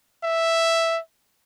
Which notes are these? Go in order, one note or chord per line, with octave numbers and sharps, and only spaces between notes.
E5